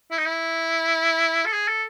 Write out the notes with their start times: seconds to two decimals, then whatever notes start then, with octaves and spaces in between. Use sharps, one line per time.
0.11 E4
0.18 D#4
0.26 E4
1.46 A4
1.53 G#4
1.68 A4